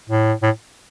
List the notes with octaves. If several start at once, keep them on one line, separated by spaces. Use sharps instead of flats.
A2
A2